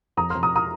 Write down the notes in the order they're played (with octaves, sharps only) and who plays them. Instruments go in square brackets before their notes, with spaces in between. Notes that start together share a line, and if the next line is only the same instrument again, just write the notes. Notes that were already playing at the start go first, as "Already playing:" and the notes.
[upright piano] F2 A#5 D#6
F2 C6 F6
A#5 D#6
A#5 D#6